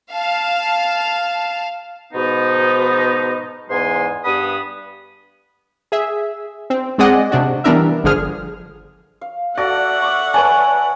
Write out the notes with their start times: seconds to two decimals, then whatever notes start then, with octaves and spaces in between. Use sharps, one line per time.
0.11 F5 A5
2.13 G#2 B2 F3 B3 D#4
3.70 E2 G#2 G#3 G#5 C6
4.25 G2 B3 B5 D#6
5.92 G#4 E5
6.70 C4
6.98 G#3 C4 G#4 D5 D#5 F#5
7.31 C3 D4 F#4
7.64 E3 G3 B3 D4 A#4 E5
8.04 G1 D3 F3 G#4 F6
9.21 F5
9.57 F#4 A4 D5 E5 F#5
10.02 C#6 D6
10.34 B4 C#5 D5 G#5 A5